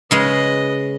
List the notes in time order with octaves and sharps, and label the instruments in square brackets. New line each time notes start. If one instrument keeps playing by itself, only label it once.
[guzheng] C#3 G#3 [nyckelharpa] B4 D#5